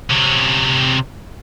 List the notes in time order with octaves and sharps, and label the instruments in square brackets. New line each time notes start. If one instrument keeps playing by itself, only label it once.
[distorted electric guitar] C3 C#4